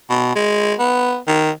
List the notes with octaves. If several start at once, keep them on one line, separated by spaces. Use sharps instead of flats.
B2
G#3
B3
D#3